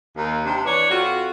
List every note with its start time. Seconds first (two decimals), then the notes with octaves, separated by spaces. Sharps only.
0.17 D#2
0.46 C3 D4 D#4 C5
0.65 E3 B4 C#5 D5
0.90 F2 F4 F#4